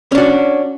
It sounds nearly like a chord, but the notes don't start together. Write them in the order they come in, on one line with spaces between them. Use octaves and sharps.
C#4 D4 F#4